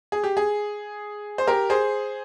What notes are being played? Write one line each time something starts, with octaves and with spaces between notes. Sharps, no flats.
G#4
G4
G#4
C5
G4 A#4
G#4 C5